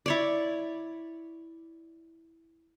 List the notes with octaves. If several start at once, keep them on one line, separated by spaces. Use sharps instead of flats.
E4 C#5 D5